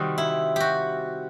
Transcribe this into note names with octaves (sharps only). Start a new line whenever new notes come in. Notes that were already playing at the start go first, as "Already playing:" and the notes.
Already playing: C3 D#3 G3 C4 F#4
E4
F#4 G4